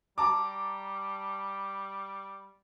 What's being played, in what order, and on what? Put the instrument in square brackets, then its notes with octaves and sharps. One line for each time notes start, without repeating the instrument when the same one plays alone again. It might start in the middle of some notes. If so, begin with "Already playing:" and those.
[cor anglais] G3 [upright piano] A5 A#5 D6